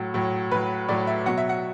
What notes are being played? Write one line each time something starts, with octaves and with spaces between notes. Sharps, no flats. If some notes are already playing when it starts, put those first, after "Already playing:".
Already playing: A2 F#3
A2 F#3
A2 F#3 B4
A2 F#3 D5
E5
B2 F#3 F#5
E5
F#5